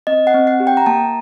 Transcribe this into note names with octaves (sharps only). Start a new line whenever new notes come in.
C4 D#5
F#5
C4
F#5
G4
G5
A#5
A#3 A5